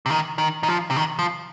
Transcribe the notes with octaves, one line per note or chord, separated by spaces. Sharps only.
C3
D#3
D#3
D#3
F3
C3
D#3
F3